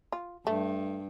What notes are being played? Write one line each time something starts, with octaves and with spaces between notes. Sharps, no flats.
F4
G2 A3